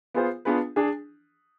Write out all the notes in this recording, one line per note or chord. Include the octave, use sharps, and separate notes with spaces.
B3 F4 G#4 C5
B3 D4 F4 G#4 B4
D4 G#4